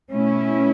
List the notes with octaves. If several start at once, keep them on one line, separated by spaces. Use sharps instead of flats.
B2 A3 C#4 E4